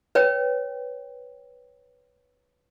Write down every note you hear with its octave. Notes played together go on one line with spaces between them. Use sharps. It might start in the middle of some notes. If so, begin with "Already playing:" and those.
B4 C#5 G5